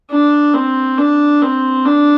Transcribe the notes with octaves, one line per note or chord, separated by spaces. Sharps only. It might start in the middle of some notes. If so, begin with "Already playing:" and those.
D4
C4
D4
C4
D4